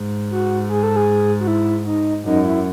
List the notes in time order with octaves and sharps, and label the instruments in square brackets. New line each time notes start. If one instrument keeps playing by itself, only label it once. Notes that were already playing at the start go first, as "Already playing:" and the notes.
Already playing: [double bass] G#2
[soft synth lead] F#4
G#4
A4
G#4
F#4
E4
D#4
[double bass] F#2 [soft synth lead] D#4
[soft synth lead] E4